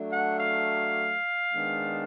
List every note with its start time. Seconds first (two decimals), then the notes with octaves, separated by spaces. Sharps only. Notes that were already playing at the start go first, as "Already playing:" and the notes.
Already playing: F#3 A3 D4
0.11 F#5
0.39 F5
1.53 D#3 G#3 B3 D4